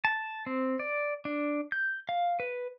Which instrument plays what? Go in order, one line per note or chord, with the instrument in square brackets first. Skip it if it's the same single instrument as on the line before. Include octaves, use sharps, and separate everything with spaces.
[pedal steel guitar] A5
C4
D5
D4
G6
F5
B4